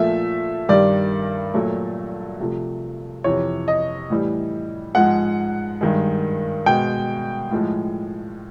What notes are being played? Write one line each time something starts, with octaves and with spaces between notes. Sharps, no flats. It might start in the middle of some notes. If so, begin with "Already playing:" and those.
Already playing: A#2 F3 A3 E5
G2 D#3 G3 D5
A#2 F#3 A3
C3 F3 A3
F2 C3 E3 C#5
D#5
A2 E3 G3
G#2 F3 G#3 F#5
G2 D#3 G#3
B2 G#3 G5
A2 F3 G#3